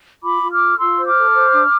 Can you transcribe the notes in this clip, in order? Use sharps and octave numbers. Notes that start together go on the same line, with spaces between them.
F4 B5 D6
F4
D6 F6
A4
F4 C6 E6
C5
D6 F6
A4
C5
D4